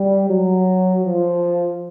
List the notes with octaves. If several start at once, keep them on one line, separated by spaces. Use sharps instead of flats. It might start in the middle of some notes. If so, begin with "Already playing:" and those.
Already playing: G3
F#3
F3